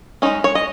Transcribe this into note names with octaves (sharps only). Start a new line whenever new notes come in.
G#3 C#4 D#4
C#5
D#5